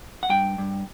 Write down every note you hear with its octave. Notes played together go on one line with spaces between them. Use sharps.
F#5
G2 G5
G2